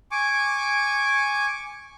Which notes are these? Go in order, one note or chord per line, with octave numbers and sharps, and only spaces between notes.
G#5 C#6 D6